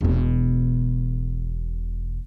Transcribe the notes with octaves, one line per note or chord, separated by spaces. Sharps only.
E1 B2